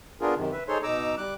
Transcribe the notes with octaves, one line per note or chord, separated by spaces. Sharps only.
B3 D4 F4 G#4 A#4
F#2 C3 D#3
B4 E5
D#4 G#4 A4 C5 C#5 C6
B2 D#4 A#5 D6 E6
G3 D6 F#6